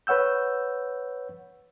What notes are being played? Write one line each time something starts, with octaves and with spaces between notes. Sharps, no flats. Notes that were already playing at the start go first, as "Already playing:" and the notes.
B4 C#5 F#5 E6 G6